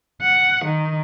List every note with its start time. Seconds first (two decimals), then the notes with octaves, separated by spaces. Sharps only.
0.22 F#5
0.65 D#3